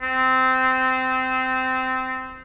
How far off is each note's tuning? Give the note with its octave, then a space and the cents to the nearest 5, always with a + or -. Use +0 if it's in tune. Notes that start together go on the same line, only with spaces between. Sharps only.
C4 -15